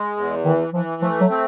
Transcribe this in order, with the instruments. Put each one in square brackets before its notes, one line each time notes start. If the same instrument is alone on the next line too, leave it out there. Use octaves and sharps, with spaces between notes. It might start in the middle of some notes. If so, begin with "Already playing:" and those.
Already playing: [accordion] G#3
E2
[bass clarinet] D#3 [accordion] E3
[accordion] E3 [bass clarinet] F3
[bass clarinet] F3 [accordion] A3
[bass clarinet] F#3
[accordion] C4